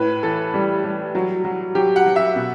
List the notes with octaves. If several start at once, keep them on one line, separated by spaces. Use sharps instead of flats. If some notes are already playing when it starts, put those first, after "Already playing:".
Already playing: A2 B4
E3 A4
G3
G3
F#3
F#3
F#3 G4
F#5
F#3
E5
B2